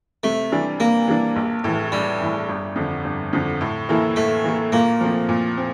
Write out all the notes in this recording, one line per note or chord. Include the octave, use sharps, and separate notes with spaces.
C3 A3
E3 G3 D4
C3 A#3
E3 G3 D4
A#1
A2 E3
A#1 G3
A2 E3
G1
F2 D3
G1
F2 D3
A2
E3 A#3 E4 A4
A2 A3
E3 A#3 E4 A4
A#2 A#3
F3 A3 C4
A#2
C4